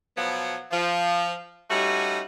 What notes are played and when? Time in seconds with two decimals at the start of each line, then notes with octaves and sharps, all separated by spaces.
0.17 B2 F3 F#3 B3
0.71 F3
1.70 G3 A3 C#4 D#4 F#4